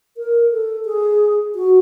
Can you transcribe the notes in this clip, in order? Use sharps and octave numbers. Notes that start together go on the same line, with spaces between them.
A#4
A4
G#4
F#4